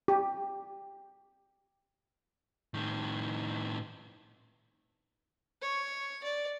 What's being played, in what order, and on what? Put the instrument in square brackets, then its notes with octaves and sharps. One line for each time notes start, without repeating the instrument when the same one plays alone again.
[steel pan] G4
[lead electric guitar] A2 D#3
[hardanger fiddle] C#5
D5